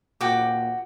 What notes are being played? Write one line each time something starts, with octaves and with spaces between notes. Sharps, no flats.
A#2 F#4 G5 D6